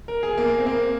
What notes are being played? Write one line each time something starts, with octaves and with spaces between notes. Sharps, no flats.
A#4
G#4
A#3
C4
A#3